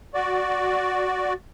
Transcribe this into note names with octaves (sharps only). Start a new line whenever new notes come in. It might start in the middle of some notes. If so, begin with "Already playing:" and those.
F#4 D5